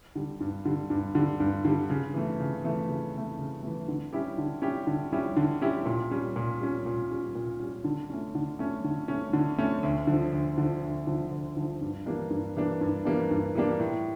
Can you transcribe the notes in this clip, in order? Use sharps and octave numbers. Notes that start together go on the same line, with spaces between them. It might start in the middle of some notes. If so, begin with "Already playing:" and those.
D3 G3
G2
D3 G3
G2
D3 G3
G2
D3 G3
C#3
E3 A3
C#3
E3 A3
C#3
E3 A3
C#3
E3 A3
D3
G3 C#4 E4 G4
D3
G3 C#4 E4 G4
D3
G3 C#4 E4 G4
D3
G3 C#4 E4 G4
A#2
G3 C#4
A#2
G3 C#4
A#2
G3 C#4
A#2
G3 C#4
D3
A3 C#4
D3
A3 C#4
D3
A3 C#4
D3
A3 C#4
D2
D3 F3
D2
D3 F3
D2
D3 F3
D2
D3 F3
G2
E3 G3 A#3 D4
G2
E3 G3 A#3 D4
G2
E3 G3 A#3 D4
G2
E3 G3 A#3 D4
A2